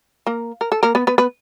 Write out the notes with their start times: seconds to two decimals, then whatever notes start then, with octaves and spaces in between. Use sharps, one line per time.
0.27 A#3 A#4
0.61 A#4
0.72 A4
0.83 A#3 A#4
0.95 B3 B4
1.07 B3 B4
1.18 B3 B4